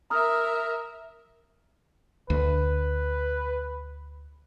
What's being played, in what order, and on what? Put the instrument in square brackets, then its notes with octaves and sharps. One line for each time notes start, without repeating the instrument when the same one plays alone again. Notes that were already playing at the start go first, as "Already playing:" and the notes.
[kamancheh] A#4 E5 [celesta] A#5 D#6 F6
[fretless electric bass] D2 [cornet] B4